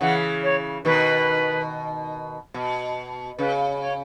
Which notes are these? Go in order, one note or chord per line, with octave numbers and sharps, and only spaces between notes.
C#3 E3 F#5
C#5
B2 D#3 B4
B2
C#3 B4
C#5